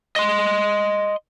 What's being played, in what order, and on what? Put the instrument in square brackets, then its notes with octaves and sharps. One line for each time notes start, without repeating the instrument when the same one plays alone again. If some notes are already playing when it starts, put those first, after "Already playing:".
[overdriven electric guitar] D#5 C6